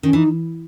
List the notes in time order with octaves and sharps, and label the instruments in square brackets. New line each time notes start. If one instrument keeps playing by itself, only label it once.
[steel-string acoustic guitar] D#3 [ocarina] C#4
[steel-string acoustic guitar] E3 [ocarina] D#4